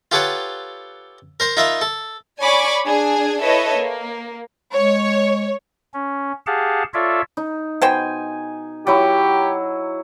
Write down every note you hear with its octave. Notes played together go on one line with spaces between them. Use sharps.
F4 G4 A4 B4 C#5 F#5
A#4 C5 A#5
D#4 F4 A#4 E5 B5
A4
C#5 D5 G#5 B5 C#6 D6
D4 G#4 G#5
E4 A4 B4 C#5 D#5 E5
A#3
G#3 C#5
C#4
G4 G#4 F5 F#5 A5
F4 A4 C#5 D5 E5
D#4
B2 C5 G5 G#5
F#3 E4 G4